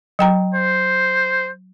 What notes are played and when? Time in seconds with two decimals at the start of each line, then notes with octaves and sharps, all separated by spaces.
0.19 F#3 G5 A#5
0.54 C5